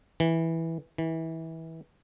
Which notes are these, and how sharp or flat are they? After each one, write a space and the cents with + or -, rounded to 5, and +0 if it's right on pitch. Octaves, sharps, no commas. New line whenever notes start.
E3 -10
E3 -25